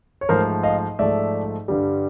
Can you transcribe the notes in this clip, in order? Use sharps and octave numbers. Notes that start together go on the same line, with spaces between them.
C#5
G#2 F3 A3 A#4 C5
D#5 F5
G#2 F3 A3 D5 E5
G2 D3 G3